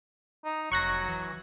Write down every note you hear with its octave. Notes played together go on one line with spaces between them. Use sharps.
D#4
F1 F#3 C#6 F#6 A#6
E3